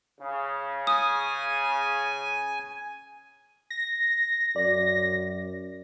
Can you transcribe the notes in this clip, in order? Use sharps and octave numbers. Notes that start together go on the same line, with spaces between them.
C#3
G#5 D#6
A#6
F#2 D5